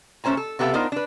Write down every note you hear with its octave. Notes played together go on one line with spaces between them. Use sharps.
A#2 A3 C#4 C5 G#5 A#5
A4
C3 B3 G4 A4 E5 F5
B3 D4 D#4 F4 A#4 C5
D4 B4